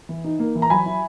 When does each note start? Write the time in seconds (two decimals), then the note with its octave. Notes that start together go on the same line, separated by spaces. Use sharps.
0.09 E3
0.24 D#4
0.39 A#3
0.55 E3
0.62 A#5
0.70 F#3 G#5 B5
0.86 E4